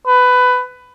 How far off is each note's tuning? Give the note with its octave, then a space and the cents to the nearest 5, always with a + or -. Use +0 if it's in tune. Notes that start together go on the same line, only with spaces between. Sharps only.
B4 +15